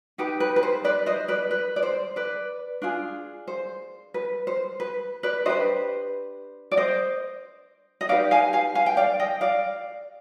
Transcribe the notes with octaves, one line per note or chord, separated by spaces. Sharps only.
D#4 G4 B4
B4
B4
C5
B4 D5
C5 D#5
B4 D5
B4
D5
C5
B4 D5
D4 F4 G#4
C5
B4
C5
B4
B4 D5
D4 G4 B4 C5 D#5
D5
C5 D#5
D#5
D#4 G4 B4 D5 F5
F5 G#5
F5 G#5
F5 G#5
G5
D5 F5
D#5 G5
D5 F5